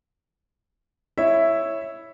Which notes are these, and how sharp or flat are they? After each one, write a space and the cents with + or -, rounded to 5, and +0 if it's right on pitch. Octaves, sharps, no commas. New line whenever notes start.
E4 +0 C#5 -5 E5 +0